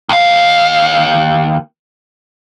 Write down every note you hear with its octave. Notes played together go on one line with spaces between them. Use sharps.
D#2 F5